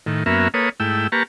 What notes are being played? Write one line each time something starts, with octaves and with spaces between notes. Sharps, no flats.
A2 D#3
F#2 A#3 B3 C#4 A#4 E5
A#3 A4 B4 C#5 D#6
G#2 A3 E4 G5 E6
A#3 G4 B4 A5 A#5 C#6